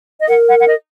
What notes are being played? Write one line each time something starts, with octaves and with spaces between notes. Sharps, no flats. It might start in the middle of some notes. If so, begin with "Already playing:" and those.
D#5
A#4 F#5
F#5
F#5
D#5